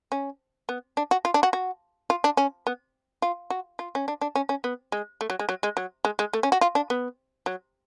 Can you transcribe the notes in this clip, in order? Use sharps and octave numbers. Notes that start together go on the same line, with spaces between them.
C#4
B3
D4
F#4
F4
D4
F#4
F#4
F4
D4
C#4
B3
F4
F#4
F4
C#4
D4
D4
C#4
C#4
B3
G#3
A3
F#3
G#3
F#3
G#3
F#3
G#3
G#3
A3
C#4
F#4
F4
D4
B3
F#3